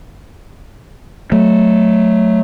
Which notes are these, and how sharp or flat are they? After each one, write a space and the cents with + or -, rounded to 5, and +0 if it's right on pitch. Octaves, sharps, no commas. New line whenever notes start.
F#3 +0 A3 +0